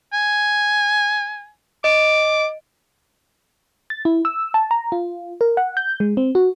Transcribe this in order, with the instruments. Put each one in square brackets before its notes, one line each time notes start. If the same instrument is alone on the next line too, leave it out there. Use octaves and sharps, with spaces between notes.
[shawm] G#5
[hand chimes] D#5 D7 [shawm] D6
[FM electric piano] A6
E4
E6
A5
A#5
F4
A#4
F#5
G6
G#3
C4
F#4